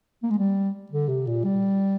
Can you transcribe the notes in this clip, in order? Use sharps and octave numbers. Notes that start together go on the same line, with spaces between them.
A#3
G#3
G3
D3
C3
A#2
G3